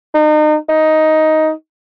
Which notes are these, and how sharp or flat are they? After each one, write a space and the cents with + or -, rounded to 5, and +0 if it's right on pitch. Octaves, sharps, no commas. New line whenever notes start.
D#4 -35
D#4 +10